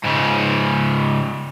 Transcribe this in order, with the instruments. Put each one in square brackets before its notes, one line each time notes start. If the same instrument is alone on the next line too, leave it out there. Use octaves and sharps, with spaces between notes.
[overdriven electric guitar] G#2 C#3